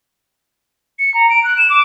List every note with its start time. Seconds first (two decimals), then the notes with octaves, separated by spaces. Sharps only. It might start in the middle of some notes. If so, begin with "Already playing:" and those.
0.99 C#7
1.14 A#5
1.30 D7
1.44 F#6
1.58 E7
1.70 D6